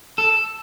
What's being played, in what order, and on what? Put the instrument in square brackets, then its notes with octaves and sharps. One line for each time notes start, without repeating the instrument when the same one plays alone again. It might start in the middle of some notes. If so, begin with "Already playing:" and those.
[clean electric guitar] A4